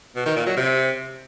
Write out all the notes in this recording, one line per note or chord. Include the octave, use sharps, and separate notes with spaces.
B2
D#3
A#2
F#3
C3